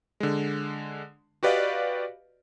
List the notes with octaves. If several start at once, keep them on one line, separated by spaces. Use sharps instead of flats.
D3 G#3
F#4 G4 B4 D5 D#5 F5